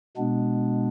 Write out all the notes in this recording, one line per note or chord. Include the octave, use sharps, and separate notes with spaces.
B2 G#3 B3 D4